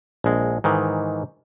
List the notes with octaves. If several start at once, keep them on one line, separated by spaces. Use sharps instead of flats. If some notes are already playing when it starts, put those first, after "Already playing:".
A#1 G#3
G#2 D#3 E3